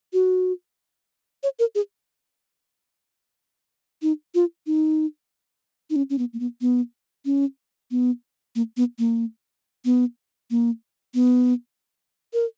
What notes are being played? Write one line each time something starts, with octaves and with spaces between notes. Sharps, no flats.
F#4
C#5
A#4
G#4
D#4
F4
D#4
D#4
C#4
C#4
B3
A#3
B3
B3
C#4
B3
A#3
B3
A#3
B3
A#3
B3
A#4